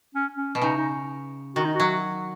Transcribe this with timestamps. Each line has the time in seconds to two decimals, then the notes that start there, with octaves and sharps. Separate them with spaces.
0.15 C#4
0.37 C#4
0.55 B2
0.62 C#3 D#4
0.77 D#4
1.56 D#3 F#4
1.65 D#4
1.75 F#3 F#4